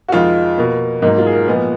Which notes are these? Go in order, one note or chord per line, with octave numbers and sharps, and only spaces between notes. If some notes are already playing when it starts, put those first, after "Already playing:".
F#4
F2 D#3 G#3 F4
B2 A#3
G#2 F#3 A#3 D#4
F4
G#4
A#4
A#2 F3 G#3 B3 B4